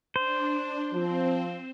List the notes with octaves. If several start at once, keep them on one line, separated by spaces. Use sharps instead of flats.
D4 C5
F3 C4